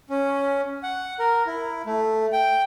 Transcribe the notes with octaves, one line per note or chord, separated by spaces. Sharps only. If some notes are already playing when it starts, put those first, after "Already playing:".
C#4
F#5
A#4
E4
A3
G5